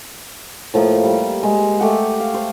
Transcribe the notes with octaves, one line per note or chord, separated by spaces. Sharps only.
A2 F3 A3 A#3
G3
G#3
A3 G4 F#5
F5
C5